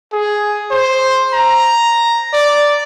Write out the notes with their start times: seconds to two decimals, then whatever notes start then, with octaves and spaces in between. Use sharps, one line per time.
0.13 G#4
0.71 C5
1.33 A#5
2.33 D5